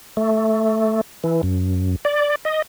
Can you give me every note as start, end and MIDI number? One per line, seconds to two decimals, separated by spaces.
0.17 1.01 57
1.24 1.41 52
1.43 1.96 42
2.05 2.35 74
2.45 2.62 75